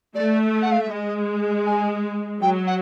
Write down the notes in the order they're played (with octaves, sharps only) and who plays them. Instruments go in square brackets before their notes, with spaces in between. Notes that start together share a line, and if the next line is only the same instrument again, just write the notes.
[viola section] A3 [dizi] D5
[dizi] F#5
F5
E5
[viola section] G#3 [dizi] D#5
[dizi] G#5
[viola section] F#3 [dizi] G5
[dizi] F#5